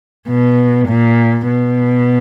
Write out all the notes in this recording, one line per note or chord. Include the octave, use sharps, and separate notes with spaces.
B2
A#2
B2